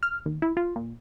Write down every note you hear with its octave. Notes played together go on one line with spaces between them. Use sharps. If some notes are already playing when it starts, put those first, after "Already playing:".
F6
D#2
E4
F4
A#2